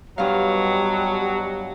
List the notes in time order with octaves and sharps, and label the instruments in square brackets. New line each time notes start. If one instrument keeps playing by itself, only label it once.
[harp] G2 F5 [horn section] B2 F#3 [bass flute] G3